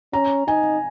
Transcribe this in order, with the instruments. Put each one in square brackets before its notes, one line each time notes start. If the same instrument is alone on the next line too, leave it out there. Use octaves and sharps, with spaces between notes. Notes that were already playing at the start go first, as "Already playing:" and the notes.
[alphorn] C#4 [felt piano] A#5
[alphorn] D#4 [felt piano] G#5